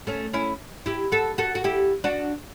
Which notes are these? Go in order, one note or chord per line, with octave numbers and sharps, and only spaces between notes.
A3 C#4
C#4 E4
E4 G4
F#4 A4
F#4 A4
F#4
E4 G4
D4 F#4